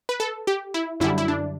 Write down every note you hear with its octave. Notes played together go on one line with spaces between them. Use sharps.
B4
A4
G4
E4
F#2 D3 G3 E4
E4
D4